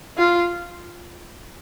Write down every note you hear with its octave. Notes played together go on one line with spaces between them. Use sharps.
F4